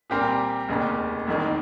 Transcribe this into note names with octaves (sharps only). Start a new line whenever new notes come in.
A#2 G3 C4 G4 A#4
F1 D#2 C#3
F1 F2 D#3 A#3